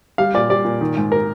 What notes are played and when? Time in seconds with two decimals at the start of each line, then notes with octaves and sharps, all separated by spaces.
0.18 G3 F5
0.34 A#2 D5
0.50 G3 D5
0.65 A#2
0.81 D#3
0.97 G#2
1.12 A#4